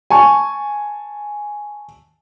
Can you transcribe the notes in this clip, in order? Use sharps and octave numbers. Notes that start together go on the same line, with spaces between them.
G#5 A5 C#6